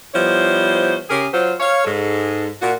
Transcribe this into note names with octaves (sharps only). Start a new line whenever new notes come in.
F3 G3 B3 E4 C5 C#5
C#3 G4 G#4 A#4
F#3 F4 C5
C#5 F5
G#2 G#3 A4
A#2 F#4